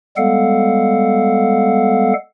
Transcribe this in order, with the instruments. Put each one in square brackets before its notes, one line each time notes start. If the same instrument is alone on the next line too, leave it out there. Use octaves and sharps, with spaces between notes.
[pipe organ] G3 G#3 B3 A4 F5 F#5